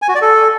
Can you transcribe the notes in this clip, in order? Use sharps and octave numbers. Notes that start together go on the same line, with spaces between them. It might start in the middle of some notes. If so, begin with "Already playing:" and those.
G#5
F#4
D5
A4